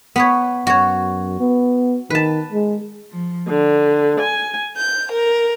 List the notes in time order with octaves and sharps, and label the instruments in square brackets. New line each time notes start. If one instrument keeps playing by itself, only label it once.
[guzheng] B3 B4 C#5
[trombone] F#2 [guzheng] F#4 C#5
[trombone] B3
[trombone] D#3 [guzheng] B4 A5
[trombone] G#3
[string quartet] F3
D3
G#5
G6
A#4